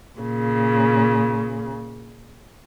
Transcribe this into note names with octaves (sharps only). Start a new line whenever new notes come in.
A#2 C#3